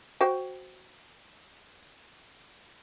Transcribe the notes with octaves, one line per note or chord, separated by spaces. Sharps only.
F#4 C5 G5